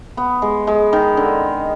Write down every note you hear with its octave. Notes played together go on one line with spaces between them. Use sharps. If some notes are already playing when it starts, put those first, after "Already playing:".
B3
G#3
G#3
D#3
D3